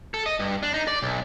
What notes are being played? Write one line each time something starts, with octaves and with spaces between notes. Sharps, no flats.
A4
D#5
G2
D4
D#4
D5
B1